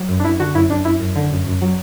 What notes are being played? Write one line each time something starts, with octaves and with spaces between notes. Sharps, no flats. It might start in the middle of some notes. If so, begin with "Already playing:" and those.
Already playing: F#3
F#2
D4
F#2 E4
D3 F#4
F#2 E4
F#2 D4
F#2 E4
F#2
D3
F#2
F#2
F#3